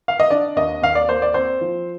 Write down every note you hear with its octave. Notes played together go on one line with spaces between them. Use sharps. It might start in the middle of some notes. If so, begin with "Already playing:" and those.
F5
D#5
D4 D5
D#2 D#5
D#2 F5
D5
A#3 C5
D5
C4 C5
F3